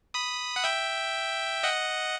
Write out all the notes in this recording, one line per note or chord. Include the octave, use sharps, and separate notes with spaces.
B5 D#6
F#5
E5 G5
D#5 F#5